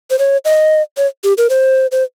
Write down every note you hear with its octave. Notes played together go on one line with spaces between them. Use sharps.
C5
C#5
D#5
C#5
G4
A#4
C5
C5